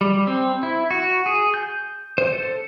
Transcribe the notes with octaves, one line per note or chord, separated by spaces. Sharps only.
G3
C4
E4
F#4
G#4
G6
C5
A4